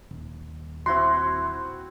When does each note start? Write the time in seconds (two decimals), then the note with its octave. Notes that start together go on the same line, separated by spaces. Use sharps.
0.11 D#1
0.86 C4 E4 F#4 C6